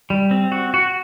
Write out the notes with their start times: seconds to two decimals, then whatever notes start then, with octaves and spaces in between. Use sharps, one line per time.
0.10 G3
0.31 C4
0.52 F#4
0.74 F#4